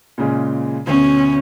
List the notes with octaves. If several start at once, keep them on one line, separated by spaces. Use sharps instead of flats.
A#2 C#3 G#3
D2 B2 C#4